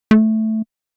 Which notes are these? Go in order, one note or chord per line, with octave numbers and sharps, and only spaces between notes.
A3